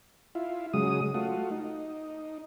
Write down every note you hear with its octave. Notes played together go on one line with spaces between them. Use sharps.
E4 F4
C#3 F#3 G#3 D#6
A3 F4 F#4
D#4